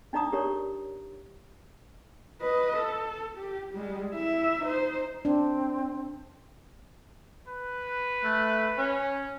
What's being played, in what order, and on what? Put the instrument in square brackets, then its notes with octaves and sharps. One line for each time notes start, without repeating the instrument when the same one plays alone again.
[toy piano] D4 D#4 D5 A#5 D#6
G4 A#4 C#5 D5
[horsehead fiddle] B4 D#5
A4
G4
G3 G#3
E4 E5
D#4 C5
[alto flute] C4 [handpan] D4
[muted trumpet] B4
[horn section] A3
C#4